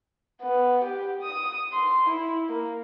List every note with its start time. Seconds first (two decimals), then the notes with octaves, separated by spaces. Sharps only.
0.42 B3
0.84 G4
1.22 D#6
1.73 C6
2.06 E4
2.49 A#3